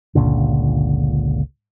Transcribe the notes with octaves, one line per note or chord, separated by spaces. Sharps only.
G1 C#2 A#2 D3